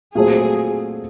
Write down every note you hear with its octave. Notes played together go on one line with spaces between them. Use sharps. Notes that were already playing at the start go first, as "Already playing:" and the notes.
A#2 F#3 A3 C4 G#4